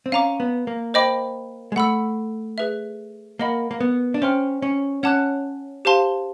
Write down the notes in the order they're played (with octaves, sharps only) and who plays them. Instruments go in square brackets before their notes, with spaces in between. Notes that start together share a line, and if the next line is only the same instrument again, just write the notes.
[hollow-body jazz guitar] C4
[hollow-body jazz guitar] C#4 [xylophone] F5 A#5 D6
[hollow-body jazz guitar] B3
A#3
[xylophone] C5 D#5 G5 B5 D6
[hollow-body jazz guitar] G#3
[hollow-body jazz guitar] A3 [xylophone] F#5 B5 E6
[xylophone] G#4 B4 E5
[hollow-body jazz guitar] A#3 [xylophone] A#4 D#5 F#5 B5
[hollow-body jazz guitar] A#3
B3
D4
[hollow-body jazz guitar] C#4 [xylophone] C5 E5 G5 C6 F6
[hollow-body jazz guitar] C#4
[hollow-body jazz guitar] C#4 [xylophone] C#5 F#5 A5 D6 F#6
[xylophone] G4 C5 F5 A5 C6